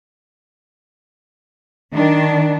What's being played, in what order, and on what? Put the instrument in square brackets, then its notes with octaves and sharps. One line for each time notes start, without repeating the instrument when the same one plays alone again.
[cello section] D#3 D4